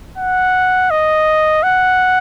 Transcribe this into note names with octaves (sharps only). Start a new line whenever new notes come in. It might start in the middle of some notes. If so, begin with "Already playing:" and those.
F#5
D#5
F#5